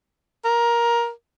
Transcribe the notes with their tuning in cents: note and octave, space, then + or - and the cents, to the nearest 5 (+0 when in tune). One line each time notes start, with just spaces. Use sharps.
A#4 +15